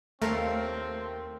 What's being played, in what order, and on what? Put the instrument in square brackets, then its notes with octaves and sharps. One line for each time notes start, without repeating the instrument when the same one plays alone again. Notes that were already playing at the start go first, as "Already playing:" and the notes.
[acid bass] D#2 [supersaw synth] A3 [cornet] C4 [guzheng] A#4 C#5 F5